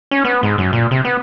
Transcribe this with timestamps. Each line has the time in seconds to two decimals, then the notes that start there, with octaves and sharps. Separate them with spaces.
0.11 C#4
0.25 B3
0.43 G#2
0.58 F#2
0.73 A#2
0.91 C3
1.05 B3